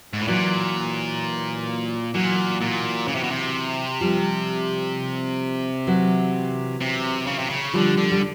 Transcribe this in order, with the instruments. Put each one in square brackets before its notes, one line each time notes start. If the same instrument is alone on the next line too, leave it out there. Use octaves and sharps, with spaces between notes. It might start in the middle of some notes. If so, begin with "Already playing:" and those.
[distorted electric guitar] G#2
A2
[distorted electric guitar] A#2 [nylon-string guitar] E3 F#3
[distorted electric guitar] A#2 [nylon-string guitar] E3 F#3
[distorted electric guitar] A#2
C#3
C3
B2
C3
[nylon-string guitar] F3 G3
E3 F#3
[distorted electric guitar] C3
C#3
C3
C#3
[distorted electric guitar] D3 [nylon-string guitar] F3 G3
[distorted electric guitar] D3
[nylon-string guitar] G3